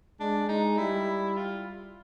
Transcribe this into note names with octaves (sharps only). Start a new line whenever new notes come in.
G#3 D4
G#3 D#4
G3 E4
F4